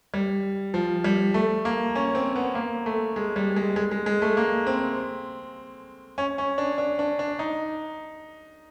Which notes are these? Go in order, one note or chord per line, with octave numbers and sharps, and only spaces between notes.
G3
F3
G3
A3
A#3
C#4
C4
B3
A#3
A3
G#3
G3
G#3
G#3
G#3
G#3
A3
A#3
C4
C#4
C#4
D4
D4
D4
D4
D#4